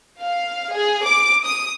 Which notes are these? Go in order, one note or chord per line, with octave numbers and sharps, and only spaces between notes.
F5
G#4
D6
D#6